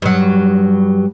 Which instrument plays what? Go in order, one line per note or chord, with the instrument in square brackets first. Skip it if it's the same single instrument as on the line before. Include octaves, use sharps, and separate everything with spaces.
[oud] G2 F#3